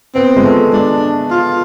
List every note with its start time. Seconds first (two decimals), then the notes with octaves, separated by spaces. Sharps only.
0.15 B3 C4
0.36 G#3
0.44 A3
0.73 G#3 D4
1.31 F4